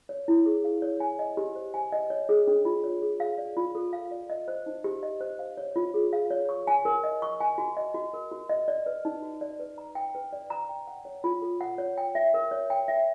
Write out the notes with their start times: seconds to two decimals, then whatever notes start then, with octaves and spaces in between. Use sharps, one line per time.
0.09 C#5
0.28 E4
0.46 G#4
0.64 F5
0.82 C#5
1.00 G#5
1.19 D#5
1.37 G4
1.55 C5
1.74 G#5
1.92 D#5
2.10 C#5
2.29 G#4
2.47 D4
2.65 F4
2.84 C#5
3.02 G#4
3.20 F5
3.38 D5
3.57 F4
3.75 A4
3.93 F5
4.11 D5
4.30 D#5
4.48 C5
4.66 D#4
4.84 G4
5.03 D#5
5.21 C5
5.39 F5
5.57 C#5
5.76 F4
5.94 G#4
6.13 F5
6.31 C#5
6.49 C#6
6.67 G#5
6.85 A#4
7.04 D#5
7.22 C#6
7.40 G#5
7.58 F#4
7.77 D#5
7.94 F#4
8.14 A#4
8.31 F#4
8.49 D#5
8.68 D5
8.86 B4
9.05 D#4
9.22 F#4
9.41 D5
9.60 B4
9.78 A#5
9.95 G5
10.15 B4
10.33 D5
10.50 A#5
10.69 G5
10.87 F#5
11.05 C#5
11.24 F4
11.42 A4
11.61 F#5
11.78 C#5
11.98 G5
12.15 E5
12.34 A#4
12.51 C#5
12.70 G5
12.88 E5